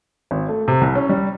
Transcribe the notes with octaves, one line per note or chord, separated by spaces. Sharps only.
G#1
A3
C3
C2
C#4
G3